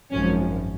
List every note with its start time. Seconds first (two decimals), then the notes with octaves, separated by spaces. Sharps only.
0.11 G#1 F#2 F3 C#4